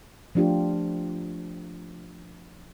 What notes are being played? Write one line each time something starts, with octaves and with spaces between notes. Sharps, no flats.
F3 A3 D4 F4 G4